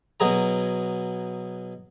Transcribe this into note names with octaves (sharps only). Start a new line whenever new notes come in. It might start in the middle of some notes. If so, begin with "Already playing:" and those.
B2 F#3 G#4 A#5